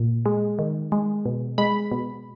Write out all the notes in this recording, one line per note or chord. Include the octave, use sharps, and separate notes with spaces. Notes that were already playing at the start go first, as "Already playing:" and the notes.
Already playing: A#2
G#3
D#3
G#3
B2
G#3 B5
B2